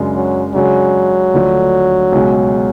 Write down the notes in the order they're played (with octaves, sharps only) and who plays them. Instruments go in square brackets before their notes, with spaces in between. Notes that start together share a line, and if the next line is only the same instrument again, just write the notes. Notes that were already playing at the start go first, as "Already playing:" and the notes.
Already playing: [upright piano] F#2 C#3 G#3 D4
[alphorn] F#3
[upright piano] C#3 G#3 D4 [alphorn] F#3
[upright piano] D2 D3 F3 A3 D4
C#2 B2 G#3